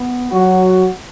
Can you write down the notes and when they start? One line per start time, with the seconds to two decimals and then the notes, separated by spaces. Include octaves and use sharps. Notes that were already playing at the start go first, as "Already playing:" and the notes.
Already playing: B3
0.31 F#3 F#4